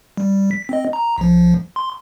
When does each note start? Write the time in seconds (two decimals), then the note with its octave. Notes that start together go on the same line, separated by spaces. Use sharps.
0.17 G3
0.51 B6
0.69 C4 D#5
0.93 A#5
1.18 B1 F3
1.76 C6